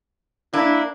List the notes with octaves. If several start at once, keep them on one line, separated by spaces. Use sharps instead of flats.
A#3 D4 E4